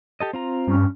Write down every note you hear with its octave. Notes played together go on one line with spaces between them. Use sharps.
G4 A4 D#5
C4 F4 A#5
G2 C#4